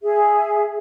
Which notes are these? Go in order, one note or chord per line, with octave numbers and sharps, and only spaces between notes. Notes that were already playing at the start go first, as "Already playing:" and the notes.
G#4 E5